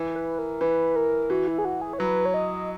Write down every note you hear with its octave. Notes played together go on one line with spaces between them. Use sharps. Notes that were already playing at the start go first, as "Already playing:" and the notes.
Already playing: E3
B4
A#4
E3 B4
A#4
E3 F#4
E4
G#4
F#4
G#4
C#5
F#3 B4
C#5
D#5